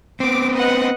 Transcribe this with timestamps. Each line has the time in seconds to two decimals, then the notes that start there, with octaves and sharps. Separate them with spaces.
0.20 B3 C4 D6
0.53 B4 D#5 F#5